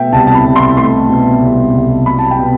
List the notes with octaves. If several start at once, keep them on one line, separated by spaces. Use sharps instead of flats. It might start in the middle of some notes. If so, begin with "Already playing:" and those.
Already playing: B2 A3 E5 G5
C2 A5
A5
B5
C2
C6
A3 C6
B2
C2
C2
F#3 B5
A5
G5
B2